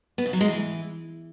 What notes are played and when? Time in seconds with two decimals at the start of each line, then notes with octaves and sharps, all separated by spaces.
0.18 B3
0.26 C#3
0.33 F#3
0.41 G#3
0.48 E3